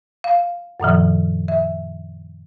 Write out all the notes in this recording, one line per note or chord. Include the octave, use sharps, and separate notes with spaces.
F5
F#2 A#2 D#3 F3
E5